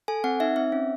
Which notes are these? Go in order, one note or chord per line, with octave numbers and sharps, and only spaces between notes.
A4 G#5
C4 F#5
D#4 E5
C4 E5
C#4